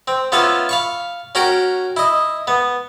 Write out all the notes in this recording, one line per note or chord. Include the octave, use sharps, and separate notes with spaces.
C4
B3 C#4 F4 E5 F5
F5 B5 C#6
C#4 F#4 A#4 G5
E4 D#5
B3